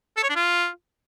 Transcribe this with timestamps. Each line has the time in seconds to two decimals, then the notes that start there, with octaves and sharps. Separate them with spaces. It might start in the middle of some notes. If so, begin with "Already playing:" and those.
0.17 A4
0.23 C#5
0.30 D4
0.36 F4